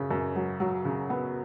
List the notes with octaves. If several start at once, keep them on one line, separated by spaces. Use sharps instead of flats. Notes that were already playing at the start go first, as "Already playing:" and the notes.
Already playing: F#2 C#3
F#2
F#3
F#3
C#3
B3